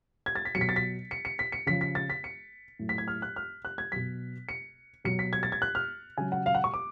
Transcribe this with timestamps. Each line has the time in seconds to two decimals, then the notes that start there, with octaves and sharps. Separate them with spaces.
0.26 G#6
0.36 A6
0.45 B6
0.55 F#3 C#7
0.58 B2 B6
0.69 A6
0.76 B6
1.11 C#7
1.25 C#7
1.39 B6
1.52 C#7
1.67 C#3 F3 B6
1.81 B6
1.95 A6
2.10 B6
2.24 C#7
2.79 A2 F#3
2.89 B6
2.98 G#6
3.08 F6
3.22 F#6
3.36 F6
3.65 F#6
3.78 G#6
3.92 B2 F#3 B6
4.49 C#7
5.04 B2 F#3 C#7
5.19 B6
5.33 G#6
5.43 A6
5.52 G#6
5.62 F#6
5.75 F6
6.17 C#3 F#3 G#5
6.32 F#5
6.46 F5
6.55 F#5
6.64 C#6
6.74 D6